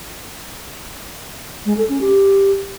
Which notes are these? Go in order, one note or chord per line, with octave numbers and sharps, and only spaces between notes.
G#3
A4
C#4
G4